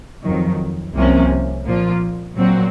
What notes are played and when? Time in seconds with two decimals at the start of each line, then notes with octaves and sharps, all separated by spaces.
0.24 F2 D#3 F#3
0.95 C2 C3 F3 A#3 C#4
1.65 A#2 F3 A#3 F4
2.35 A#2 F#3 C4 F#4